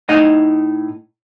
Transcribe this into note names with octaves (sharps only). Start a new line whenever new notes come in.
A2 D#4 D#5 F#5